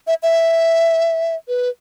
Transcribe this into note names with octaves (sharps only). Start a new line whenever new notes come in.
E5
E5
B4